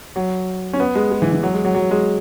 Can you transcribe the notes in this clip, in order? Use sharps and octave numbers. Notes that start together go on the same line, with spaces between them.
F#3
C#4
B3
G#3
G#3
E3
E3
F#3
G#3
F#3
F#3
G#3